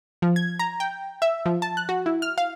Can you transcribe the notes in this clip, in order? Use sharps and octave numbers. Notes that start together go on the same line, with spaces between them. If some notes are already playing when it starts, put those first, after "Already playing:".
F3
G#6
A#5
G5
E5
F3
A5
F#6
F#4
E4
F6
F5